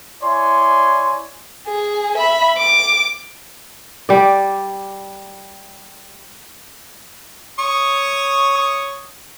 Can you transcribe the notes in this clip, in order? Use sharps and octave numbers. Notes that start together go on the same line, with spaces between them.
E4 C#5 D5 G#5 C6
G#4
E5 B5
D6
G3 D5
C#5 C#6 D#6